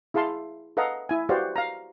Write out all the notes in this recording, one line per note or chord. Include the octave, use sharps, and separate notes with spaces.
E4 G#4 F5 A5 C6
A4 B4 D#5 F5 F#5 A#5
E4 G#5
F#4 G4 B4 C5 D5 F5
F5 A#5